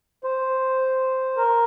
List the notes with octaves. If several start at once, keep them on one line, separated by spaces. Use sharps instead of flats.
C5
A#4